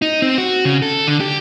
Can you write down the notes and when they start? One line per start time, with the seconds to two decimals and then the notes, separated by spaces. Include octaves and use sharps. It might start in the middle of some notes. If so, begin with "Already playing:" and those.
0.02 D#4
0.22 C4
0.38 F#4
0.65 C#3
0.82 A4
1.07 D3
1.20 G4